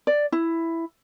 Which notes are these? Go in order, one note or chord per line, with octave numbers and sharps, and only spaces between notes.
D5
E4